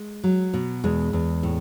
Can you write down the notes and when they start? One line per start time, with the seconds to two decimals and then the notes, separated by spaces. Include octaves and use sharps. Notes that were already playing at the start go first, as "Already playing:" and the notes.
Already playing: G#3
0.24 F#3
0.54 B2
0.84 E2 G#3
1.13 E2
1.43 A2